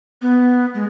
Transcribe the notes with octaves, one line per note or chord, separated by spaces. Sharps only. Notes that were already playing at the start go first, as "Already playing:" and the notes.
B3
G#3